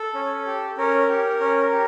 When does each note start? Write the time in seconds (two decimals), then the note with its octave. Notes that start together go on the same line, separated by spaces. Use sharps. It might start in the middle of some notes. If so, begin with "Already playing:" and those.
Already playing: A4
0.15 C#4
0.46 G4
0.78 C#4 A#4
1.09 G4
1.41 C#4
1.72 G4